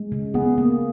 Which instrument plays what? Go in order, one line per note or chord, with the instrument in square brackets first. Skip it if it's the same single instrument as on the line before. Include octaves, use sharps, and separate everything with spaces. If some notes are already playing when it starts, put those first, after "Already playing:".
Already playing: [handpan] G#3
C#3
[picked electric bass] B3 [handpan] G#4
[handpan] A#3